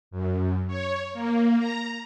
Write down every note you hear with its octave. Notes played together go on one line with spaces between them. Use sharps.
F#2
C#5
A#3
A#5